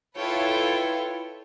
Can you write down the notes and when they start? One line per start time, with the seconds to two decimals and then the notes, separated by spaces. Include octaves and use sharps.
0.17 E4 F4 A4 B4 C#5 G5